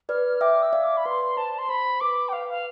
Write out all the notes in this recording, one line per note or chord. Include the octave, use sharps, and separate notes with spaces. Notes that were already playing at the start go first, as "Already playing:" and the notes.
B4 D5 F6
E5 G5 D6
E5 E6
D5 F5
D6
B5
B4 D5 C6
C5 A5
C6
C5 B5
B4 D6
G5
B4 F5
F5